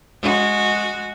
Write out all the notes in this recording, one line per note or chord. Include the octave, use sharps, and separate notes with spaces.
G#3 F#4